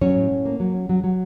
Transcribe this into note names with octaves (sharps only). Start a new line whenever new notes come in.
F#3 C#4 C#5
A2
A2
A#3
F#3
C#4
F#3
F#3